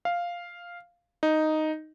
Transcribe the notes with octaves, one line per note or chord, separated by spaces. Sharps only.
F5
D#4